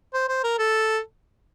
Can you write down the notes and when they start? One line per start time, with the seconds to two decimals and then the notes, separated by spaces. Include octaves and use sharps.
0.14 C5
0.29 C5
0.44 A#4
0.59 A4